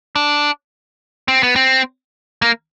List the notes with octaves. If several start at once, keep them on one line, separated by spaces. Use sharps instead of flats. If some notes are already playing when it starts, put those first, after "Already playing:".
D4
C4
B3
C4
A#3